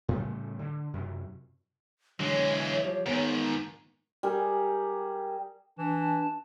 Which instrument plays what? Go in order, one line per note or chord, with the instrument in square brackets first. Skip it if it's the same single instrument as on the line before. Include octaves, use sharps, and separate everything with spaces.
[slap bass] A2 C#3 G3 A3
D3
F#2 C3
[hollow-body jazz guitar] D3 F#3 [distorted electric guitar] E3 G#3 [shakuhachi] C#5
[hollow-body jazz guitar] F3 G3
[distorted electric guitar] G#2 D#3 [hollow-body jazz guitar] B3
[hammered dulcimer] G3 G#4 A#4
[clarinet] E3 [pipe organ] D4 A5